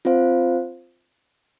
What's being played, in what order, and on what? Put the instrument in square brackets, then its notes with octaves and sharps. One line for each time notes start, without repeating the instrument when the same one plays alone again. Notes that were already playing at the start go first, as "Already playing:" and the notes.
[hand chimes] C4 F4 C5 F5